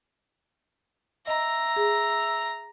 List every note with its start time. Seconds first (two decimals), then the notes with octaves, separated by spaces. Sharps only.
1.27 D#5 E5 A#5
1.76 G#4